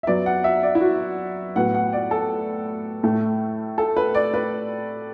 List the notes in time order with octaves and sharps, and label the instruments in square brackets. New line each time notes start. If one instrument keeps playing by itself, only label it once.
[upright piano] E5
F#2 F#3 B3 D5
F#5
E5
D5
E4
F#4
A2 F#3 B3 F#5
F#5
D5
A4
A2 A3
A4
B4
D5
B4